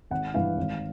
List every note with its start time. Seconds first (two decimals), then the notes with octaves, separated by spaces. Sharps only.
0.11 G#1 F#5
0.34 G2 E3 F5
0.58 G#1